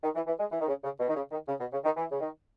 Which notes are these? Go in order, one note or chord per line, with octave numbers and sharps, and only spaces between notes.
D#3
E3
E3
G#3
E3
D#3
C#3
C#3
B2
D#3
C#3
D#3
C#3
B2
C#3
D#3
E3
C#3
D#3